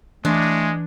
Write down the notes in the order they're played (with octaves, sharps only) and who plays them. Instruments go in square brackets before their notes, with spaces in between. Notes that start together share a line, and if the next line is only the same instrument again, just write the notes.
[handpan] E3 [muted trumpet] G#3 [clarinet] A3 [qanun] D4